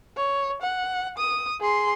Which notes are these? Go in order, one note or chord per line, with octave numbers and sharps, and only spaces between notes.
C#5
F#5
D#6
G#4 C6